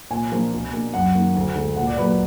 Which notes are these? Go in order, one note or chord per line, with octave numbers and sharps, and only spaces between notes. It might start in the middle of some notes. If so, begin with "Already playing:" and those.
A#2 G#5
F3 A#3 D4
B2
A#3 D4
F#2 F#5
D#3 A#3
D2
D3 G#3
A#2 F#5
D5
F#3 A#3 B4
B4